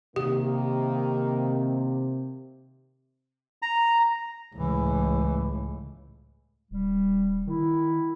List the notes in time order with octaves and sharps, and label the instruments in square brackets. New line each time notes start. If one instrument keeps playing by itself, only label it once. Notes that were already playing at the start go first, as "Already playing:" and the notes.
[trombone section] C3 [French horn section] D#3 A#3 [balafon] G4
[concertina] A#5
[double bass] C#2 A2 [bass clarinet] E3
[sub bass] D#1 [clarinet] G3
[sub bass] D#3 [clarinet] E4